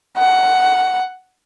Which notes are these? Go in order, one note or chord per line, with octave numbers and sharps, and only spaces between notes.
F#5